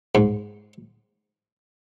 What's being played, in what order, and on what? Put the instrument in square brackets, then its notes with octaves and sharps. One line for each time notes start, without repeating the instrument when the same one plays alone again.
[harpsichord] G#2